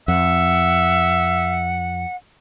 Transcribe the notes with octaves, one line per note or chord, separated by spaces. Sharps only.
F2 E5 F#5